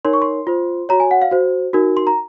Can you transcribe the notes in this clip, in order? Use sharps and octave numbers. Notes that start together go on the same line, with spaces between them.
D#4 A#4 C#5 C6
C#6
C6
F4 C5
F#4 C#5 A#5
G#5
F#5
F5
F#4 C5
D#4 F#4 A#4
C6
A#5